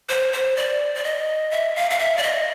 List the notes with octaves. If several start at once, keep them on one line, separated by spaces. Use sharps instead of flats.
C5
C5
D5
D5
D#5
E5
F5
F5
E5
D5
D#5